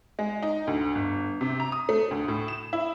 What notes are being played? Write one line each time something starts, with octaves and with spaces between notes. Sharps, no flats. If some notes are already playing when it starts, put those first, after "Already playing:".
G#3
D#4
D2
G1
C3
A#5
D#6
A3
D2
A2
E7
E4